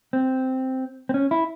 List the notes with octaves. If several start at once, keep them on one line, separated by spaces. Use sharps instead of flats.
C4
C4
C#4
E4